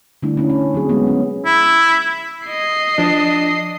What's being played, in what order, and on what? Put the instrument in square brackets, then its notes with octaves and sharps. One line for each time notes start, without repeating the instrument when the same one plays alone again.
[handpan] D3 G3 A3 D4 E4
C#4 D4 E4
C#4
F#3 C4 G#4
G#3 B3
C#4
[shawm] E4
[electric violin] D#5 C7
[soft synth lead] F3 [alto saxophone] D4